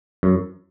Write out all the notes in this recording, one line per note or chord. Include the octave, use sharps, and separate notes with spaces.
F#2